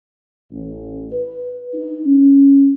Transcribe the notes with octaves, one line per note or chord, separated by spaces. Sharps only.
A1
B4
D#4
C#4